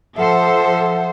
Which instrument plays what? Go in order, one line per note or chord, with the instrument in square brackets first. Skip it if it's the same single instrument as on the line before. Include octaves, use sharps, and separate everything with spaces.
[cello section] F3 A4 C5 [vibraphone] E5 F#5